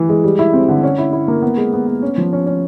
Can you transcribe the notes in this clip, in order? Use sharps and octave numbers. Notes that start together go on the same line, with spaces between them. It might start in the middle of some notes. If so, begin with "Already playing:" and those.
Already playing: E3
G#3
G3
E4
C4
D3
C#4
E4
E4
A#3
B3
G#3
B3
B3
C#4
F3
C#4
C#4